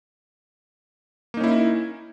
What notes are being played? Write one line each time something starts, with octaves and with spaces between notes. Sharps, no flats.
A#3 C#4 D#4 E4